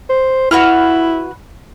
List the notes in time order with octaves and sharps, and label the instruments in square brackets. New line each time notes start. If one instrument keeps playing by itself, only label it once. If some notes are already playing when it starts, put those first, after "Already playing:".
[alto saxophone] C5
[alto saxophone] E4 [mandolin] F#4 B4 F6